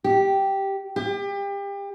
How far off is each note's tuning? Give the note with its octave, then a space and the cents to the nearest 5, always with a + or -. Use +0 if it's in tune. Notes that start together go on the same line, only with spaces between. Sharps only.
G4 -5
G4 +30